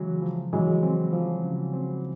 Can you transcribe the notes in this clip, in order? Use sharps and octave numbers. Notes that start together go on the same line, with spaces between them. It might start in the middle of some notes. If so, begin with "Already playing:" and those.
Already playing: C#3 E3 F#3 G#3
F3
E3 F#3 G#3
C4
F3
C#3
C4